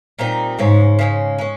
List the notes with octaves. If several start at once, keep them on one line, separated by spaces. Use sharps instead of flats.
A#2 G3 C4 D#4
G#2 C#3 G#3 C#4
C#3 G#3 C#4
G#3 C#4